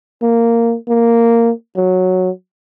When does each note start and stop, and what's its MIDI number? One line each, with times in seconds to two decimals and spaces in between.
0.22 0.76 58
0.88 1.51 58
1.76 2.29 54